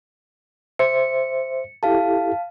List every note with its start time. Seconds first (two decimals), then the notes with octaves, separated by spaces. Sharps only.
0.79 C5 E5 C#7
1.83 E4 G4 A4 F5 A5